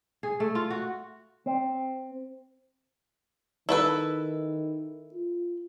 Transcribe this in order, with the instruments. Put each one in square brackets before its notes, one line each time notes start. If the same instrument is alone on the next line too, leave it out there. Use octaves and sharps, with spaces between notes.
[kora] G#4
A3
F4
F#4
[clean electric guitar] C4
[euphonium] D#3 [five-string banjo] E4 A4 B4
[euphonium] F4